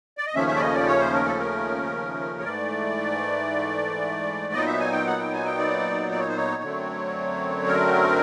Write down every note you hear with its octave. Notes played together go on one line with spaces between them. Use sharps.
D5
D#5
D#2 C#3 F3 A3 C#4 E5
E5
D5
D#5
D5
C#5
C5
A#4
A4
A#4
C#5
G#2 E3 A3 D5
A#2 F#3 B3 D#4 D#5
E5
G#5
G5
F#5
G5
G#5
G5
D5
D5
C#5
C5
C#5
F#2 D3 F#3 A3 C4
A#4